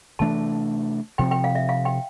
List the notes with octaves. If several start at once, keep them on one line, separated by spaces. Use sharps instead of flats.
C3 E3 A3 D4 A5
C3 F3 C4 G5
G5
F5
E5
F5
G5